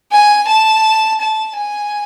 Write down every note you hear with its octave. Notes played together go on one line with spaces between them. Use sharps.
G#5
A5
A5
G#5